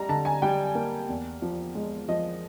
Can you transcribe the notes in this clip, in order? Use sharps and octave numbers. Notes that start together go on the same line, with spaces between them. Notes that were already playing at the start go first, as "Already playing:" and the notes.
Already playing: G3 A#5
D3 A5
G#5
G3 G5
A#3
E2
F3
G#3
F3 D#5